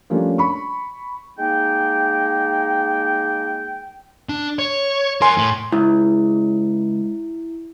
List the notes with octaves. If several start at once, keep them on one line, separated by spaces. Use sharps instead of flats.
F3 G3 A3 A#3 C#4 D4
B5 C#6
G#3 A#3 D#4 G5
D4
C#5
A#4 C#5 G#5 C6
A2
C#2 E4